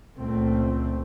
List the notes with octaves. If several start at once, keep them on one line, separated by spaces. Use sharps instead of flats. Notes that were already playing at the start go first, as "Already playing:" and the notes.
C#2 A#2 A3 C4